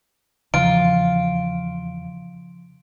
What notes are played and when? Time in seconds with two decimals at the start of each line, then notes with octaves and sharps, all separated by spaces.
0.54 E2 C#3 E3 F3 F4 F5 D7